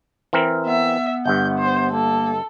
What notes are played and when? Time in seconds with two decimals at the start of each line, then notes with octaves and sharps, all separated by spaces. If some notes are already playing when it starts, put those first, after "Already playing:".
0.33 E3 C4 A#4
0.66 B3 E5
1.26 G1 G2 G6
1.58 C5
1.92 A#3 A4